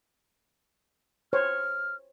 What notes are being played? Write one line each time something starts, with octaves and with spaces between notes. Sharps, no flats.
C5 C#5 F6